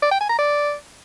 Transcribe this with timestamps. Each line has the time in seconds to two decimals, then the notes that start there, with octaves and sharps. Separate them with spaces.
0.02 D5
0.11 G5
0.21 G#5
0.30 A#5
0.39 D5